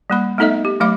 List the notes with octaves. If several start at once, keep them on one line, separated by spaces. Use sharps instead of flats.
G3 A#3 B5
A3 B3 D#4 A4 D#5 E5
G4
F#3 A3 F5 B5 D6